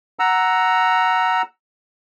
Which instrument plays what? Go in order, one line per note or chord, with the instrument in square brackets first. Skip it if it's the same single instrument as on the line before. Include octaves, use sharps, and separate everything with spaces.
[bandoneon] F#5 A#5 E6